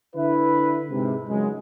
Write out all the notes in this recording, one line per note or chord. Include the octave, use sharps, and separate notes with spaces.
D3 E4 B4
G#2 C3
C#2 F#2 G#3